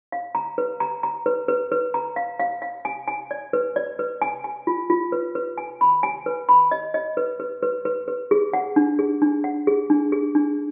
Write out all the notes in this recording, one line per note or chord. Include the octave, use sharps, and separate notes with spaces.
F5
A#5
B4
A#5
A#5
B4
B4
B4
A#5
F5
F5
F5
G#5
G#5
D5
B4
D5
B4
G#5
G#5
F4
F4
B4
B4
G#5
B5
G#5
B4
B5
D#5
D#5
B4
B4
B4
B4
B4
G#4
F#5
D4
G#4
D4
F#5
G#4
D4
G#4
D4